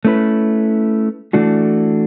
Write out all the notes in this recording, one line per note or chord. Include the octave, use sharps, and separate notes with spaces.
A3 C#4 E4 B4
E3 A3 D4 F#4